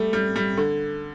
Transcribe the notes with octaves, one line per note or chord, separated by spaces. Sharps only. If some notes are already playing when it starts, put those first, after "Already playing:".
Already playing: G3 A3
G3
G3
D3